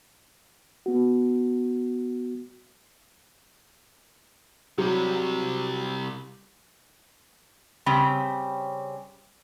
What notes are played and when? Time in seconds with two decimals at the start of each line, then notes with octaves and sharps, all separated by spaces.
0.86 B3 F#4
4.78 C3 F#3 G3
7.86 C#3 G3 C4